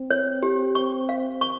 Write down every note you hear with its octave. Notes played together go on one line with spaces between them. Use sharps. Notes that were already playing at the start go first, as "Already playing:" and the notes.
Already playing: C4
C#5
G4
C#6
F5
C#6